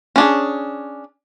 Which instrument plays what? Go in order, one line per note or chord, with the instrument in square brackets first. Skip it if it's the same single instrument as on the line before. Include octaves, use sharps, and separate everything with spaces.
[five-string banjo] C#4 D4 G#4